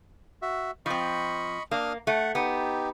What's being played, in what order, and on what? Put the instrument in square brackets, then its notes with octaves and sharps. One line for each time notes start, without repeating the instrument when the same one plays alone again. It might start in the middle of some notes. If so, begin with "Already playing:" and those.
[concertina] F#4 E5
[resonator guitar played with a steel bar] F3 C4 [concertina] D#5 B5 C#6
[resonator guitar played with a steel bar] A#3 [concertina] D4 D#6 F6
[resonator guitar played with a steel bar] A3 [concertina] F#5
[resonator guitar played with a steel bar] B3 [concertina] D#4 G4